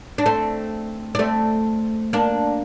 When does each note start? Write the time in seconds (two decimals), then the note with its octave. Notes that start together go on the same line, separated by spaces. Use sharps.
0.18 D4
0.26 A3 C4
1.15 D4
1.19 A3 C4
2.13 A#3 D4